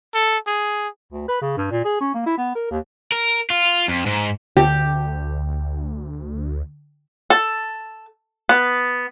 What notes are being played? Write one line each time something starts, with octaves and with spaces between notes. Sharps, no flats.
A4
G#4
D2
B4
C#3
G2
A#2
G#4
C#4
A#3
E4
B3
A#4
D#2
A#4
F4
F2
G#2
D2 D3 G4
A4
B3